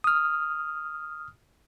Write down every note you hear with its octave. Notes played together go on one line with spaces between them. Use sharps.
D#6 F6